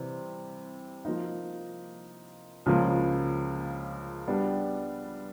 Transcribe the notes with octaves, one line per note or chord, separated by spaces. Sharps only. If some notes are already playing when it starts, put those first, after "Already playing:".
Already playing: C3 E3 G3 C4
F3 A#3 D#4
C#2 C#3 F3 A#3
G3 B3 D4